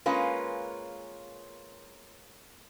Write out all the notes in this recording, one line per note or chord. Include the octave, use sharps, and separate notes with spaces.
G#3 A#3 C#4 F4 B4